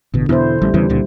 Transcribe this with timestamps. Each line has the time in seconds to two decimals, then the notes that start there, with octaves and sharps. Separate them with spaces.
0.14 A1 B2 D3
0.29 E2 B2 E4 C5
0.62 A1 G3
0.74 E2 C#3 E3 G3
0.89 C#2 A#2 D3